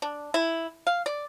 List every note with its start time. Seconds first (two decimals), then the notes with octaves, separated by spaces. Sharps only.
0.02 D4
0.34 E4
0.87 F5
1.06 D5